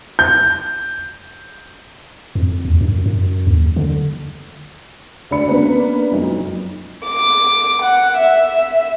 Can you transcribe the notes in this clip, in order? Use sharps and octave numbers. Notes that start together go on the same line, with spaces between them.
G6
F2
D#2
F#2
F#2
D#2
D3
D2 D4 D5 B5 C#7
A#3 B3 C#4 D4 A#4 B4
F#1 B1 F2
D6
F#5
E5